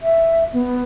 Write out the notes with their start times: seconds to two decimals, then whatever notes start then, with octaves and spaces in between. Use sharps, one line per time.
0.02 E5
0.53 B3